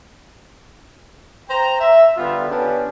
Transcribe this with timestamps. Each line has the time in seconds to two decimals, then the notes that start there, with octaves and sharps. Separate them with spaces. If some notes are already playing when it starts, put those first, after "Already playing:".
1.49 C5 G5 A#5
1.80 E5
2.17 D3 G3 B3 F4
2.49 B3 C#4 D4 G4